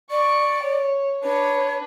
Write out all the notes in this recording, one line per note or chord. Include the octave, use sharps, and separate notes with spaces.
D5 C#6
C#5
D4 B4 C#5